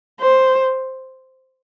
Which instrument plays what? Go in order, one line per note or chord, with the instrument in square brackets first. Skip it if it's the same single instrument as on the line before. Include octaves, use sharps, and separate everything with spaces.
[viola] C5